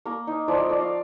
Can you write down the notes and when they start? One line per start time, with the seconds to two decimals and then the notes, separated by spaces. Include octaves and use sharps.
0.05 A#3 A#4
0.27 D#4
0.48 F3 D5
0.58 D#5
0.69 A3 D5
0.81 F5